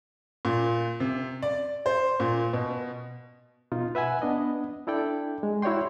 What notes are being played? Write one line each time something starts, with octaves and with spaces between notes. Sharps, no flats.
A#2
C3
D5
C5
A#2
B2
B2 D#4 F4
B4 E5 F#5 G#5
B3 D4 D#5
D4 E4 A4 D5 G5
G#3
E4 F#4 C#5 D5 G5 C6